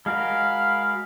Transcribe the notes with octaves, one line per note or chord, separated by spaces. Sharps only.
G#3 F#4 A#4 F5 B5 F6